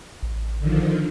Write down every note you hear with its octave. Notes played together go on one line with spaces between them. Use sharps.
A1
D3 D#3 F3